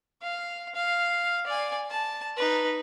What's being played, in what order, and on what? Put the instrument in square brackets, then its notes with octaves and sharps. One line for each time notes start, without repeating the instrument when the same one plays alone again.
[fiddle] F5
F5
D5 G#5
A5
D#4 B4